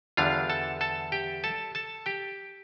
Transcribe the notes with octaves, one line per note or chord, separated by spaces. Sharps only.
E2 D3 G3 D4 F4 F5
A4 A5
A4 A5
G4 G5
A4 A5
A4 A5
G4 G5